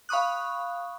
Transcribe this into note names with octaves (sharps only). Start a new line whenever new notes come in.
F5 B5 C#6 D#6 F#6